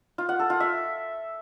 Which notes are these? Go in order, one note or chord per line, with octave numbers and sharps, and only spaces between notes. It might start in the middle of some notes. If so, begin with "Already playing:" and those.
F4
F#5
A4
F4
E5